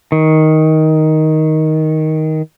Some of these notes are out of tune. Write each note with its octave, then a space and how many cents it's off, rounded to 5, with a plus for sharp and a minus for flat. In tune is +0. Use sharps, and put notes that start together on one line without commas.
D#3 +10